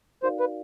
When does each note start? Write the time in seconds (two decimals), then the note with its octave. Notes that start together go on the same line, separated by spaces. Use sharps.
0.23 D#4 F#4 A#4 C5 D5 F5
0.40 B4